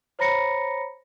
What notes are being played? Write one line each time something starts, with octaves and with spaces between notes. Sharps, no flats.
C5 C#5 A#5 B5 A#6 C#7